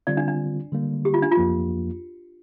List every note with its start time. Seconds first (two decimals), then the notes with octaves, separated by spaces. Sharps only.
0.07 D3 G3 C4 F4 D5
0.17 D4
0.28 D4
0.72 D3 G3 A#3
1.05 G4
1.14 F4
1.22 D4
1.31 F4
1.37 F2 F3 A#3